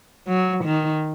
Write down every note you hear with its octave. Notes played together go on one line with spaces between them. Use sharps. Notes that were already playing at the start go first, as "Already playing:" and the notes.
F#3
D#3